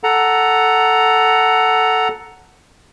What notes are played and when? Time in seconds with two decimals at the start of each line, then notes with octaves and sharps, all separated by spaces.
0.04 A4 F#5 A#5